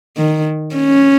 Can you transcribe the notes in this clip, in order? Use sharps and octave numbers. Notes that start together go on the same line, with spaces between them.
D#3
C#4